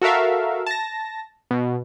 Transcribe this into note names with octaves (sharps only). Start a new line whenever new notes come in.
F#4 A4 A#4 E5 F5
A5 A#6
B2